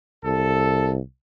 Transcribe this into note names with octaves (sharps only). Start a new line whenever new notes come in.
C2 A4